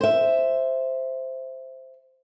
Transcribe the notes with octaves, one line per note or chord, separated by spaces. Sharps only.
C5 E5